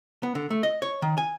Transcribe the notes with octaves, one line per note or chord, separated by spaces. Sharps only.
B3
D3
A3
D#5
C#5
D#3
G#5